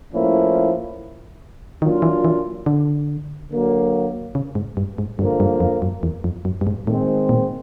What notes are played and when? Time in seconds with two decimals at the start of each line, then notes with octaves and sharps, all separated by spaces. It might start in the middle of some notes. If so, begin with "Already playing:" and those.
0.13 A2 F3 A#3 C#4 E4
1.82 D#3 F#3 A#3 D4 F4
2.02 E3
2.25 E3
2.66 D3
3.50 D3 F#3 A#3
4.35 C#3
4.55 G#2
4.77 G2
4.98 G#2
5.19 G2 D3 F3 A#3
5.40 G2
5.60 F2
5.82 F#2
6.03 E2
6.24 F2
6.45 F#2
6.61 G2
6.67 G#2
6.87 A2 D#3 G#3 C4
7.29 A#2